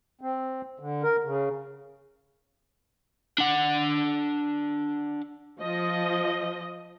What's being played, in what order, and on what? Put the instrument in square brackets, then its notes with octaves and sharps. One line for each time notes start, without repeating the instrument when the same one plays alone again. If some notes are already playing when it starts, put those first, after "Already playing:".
[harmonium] C4
D3
A#4
C#3
[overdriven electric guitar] D4 F#5
[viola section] F3 D#5